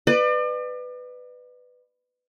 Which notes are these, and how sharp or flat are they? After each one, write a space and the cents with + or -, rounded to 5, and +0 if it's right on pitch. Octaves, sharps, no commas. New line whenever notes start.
B4 +15 D5 +40